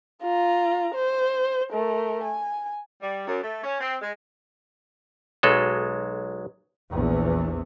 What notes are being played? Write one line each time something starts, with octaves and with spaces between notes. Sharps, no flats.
F4 A#5
C5
A3 A#4
G#5
G3
F#2
A3
C#4
C4
G#3
B1 F#3 G#3 A4
A#1 E2